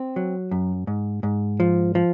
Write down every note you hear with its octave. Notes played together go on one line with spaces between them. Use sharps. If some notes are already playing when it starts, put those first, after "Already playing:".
Already playing: C4
F#3
F#2
G#2
G#2
F3
F3